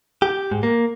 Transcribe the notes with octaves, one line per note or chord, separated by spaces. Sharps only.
G4
G#2
A#3